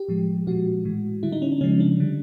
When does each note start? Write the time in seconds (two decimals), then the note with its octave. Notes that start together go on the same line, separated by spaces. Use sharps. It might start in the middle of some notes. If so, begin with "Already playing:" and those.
Already playing: G4
0.08 A2 F3 G#3
0.47 A#2 F3 G#3 F#4
0.85 A2 E3 G#3
1.23 D3 G3 E4
1.32 D#4
1.42 C#4
1.52 D4
1.61 C#3 F3 G#3 C#4
1.80 D4
2.00 D3 G3